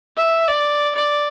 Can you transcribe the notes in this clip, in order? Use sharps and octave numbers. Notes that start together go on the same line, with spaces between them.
E5
D5
D5